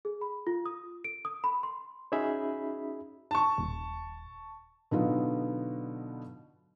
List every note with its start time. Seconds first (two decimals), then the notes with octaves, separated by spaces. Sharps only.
0.05 G#4
0.21 B5
0.47 F4
0.66 D#6
1.04 D7
1.25 D#6
1.44 B5
1.63 C6
2.12 C#4 D#4 F#4 G#4 E5 B5
3.31 A5 C#6
3.58 D#1
4.91 B2 D3 F#3 B3 D#4 F4